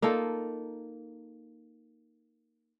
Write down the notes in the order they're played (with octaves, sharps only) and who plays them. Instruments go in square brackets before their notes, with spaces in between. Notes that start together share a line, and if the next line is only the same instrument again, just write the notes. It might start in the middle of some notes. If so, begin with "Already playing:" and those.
[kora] A#3 D#4 F4 A4